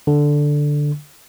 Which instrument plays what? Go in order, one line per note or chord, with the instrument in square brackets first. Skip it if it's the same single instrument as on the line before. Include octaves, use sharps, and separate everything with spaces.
[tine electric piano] D3